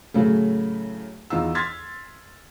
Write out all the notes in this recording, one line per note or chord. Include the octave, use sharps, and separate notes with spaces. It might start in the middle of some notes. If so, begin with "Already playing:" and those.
A2 C#3 F#3 A3
E2 B3 D#4 F4 F5 E6
C6 F6 G#6 A6 B6